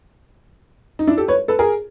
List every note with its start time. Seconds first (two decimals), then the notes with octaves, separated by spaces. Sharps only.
0.99 D#4
1.07 D4 E4
1.18 G4 A4
1.28 B4 C#5
1.48 A4 B4
1.59 G#4 A#4